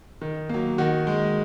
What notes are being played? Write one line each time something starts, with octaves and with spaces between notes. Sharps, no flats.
D#3
F#3 A#3
D#3 F#4
G#3